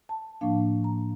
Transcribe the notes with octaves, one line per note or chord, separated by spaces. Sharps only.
A5
A2 F3 A#3 D4 F5
A#5